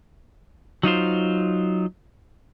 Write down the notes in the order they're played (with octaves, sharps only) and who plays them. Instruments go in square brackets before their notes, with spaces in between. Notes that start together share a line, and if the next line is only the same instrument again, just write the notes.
[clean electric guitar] F#3 D#4 F4 C5